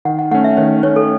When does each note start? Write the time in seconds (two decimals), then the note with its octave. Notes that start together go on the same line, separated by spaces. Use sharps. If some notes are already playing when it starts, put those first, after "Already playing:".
0.05 D#3 F#5
0.19 F#5
0.31 A3 C#4 F#5
0.44 E5
0.57 D#3 C#5
0.83 A3 C#4 C#5
0.96 A4